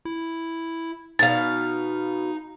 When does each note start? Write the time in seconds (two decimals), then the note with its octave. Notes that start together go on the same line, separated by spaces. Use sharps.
0.05 E4
1.19 B2 D#4 F5 A6